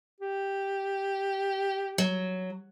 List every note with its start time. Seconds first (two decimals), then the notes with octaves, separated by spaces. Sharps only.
0.20 G4
1.98 F#3